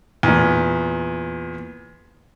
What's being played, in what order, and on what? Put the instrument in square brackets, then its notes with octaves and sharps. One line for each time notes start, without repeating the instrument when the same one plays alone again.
[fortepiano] E2 A#2